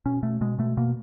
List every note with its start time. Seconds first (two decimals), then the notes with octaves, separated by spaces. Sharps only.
0.06 B2 C#4
0.23 B2 A3
0.41 B2 G#3
0.59 B2 A3
0.77 B2 A#3